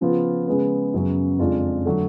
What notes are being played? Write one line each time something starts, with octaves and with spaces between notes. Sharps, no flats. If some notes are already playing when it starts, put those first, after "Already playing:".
C#3 F3 B3 F4
C#3 G#3 B3
F#2 C#3 F#3 B3
F2 C#3 G#3 D4 F4
D3 F#3 A3